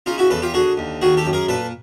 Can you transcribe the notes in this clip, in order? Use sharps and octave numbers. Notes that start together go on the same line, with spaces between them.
C#3 D#4 F4
E4 F#4
E2 A4 B4
F4 G4
D3 F#4 G#4
D#2
D#3 F#4 G#4
G4 A4
F#2
G#4 A#4
A#2 A4 B4